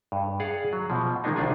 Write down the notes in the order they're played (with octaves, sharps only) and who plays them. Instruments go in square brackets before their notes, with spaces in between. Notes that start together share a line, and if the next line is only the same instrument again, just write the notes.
[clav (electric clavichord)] G2
G#4 D5 F5 F#5
F#3
B2 F3
D#3 F3 G#3 A#3 D4 D#4
C2 D#3 D4 F4 D5 G#5